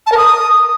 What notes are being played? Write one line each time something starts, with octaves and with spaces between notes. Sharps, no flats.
A5
A#4
D#6